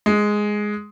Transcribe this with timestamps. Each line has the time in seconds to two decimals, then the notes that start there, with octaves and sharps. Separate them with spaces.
0.06 G#3